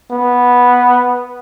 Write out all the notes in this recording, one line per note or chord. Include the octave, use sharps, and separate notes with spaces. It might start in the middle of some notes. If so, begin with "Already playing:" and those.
B3